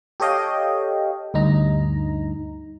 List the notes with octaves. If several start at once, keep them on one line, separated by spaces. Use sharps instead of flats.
G4 A4 C#5 D#5 F5 G5
D2 G2 D#4 A#5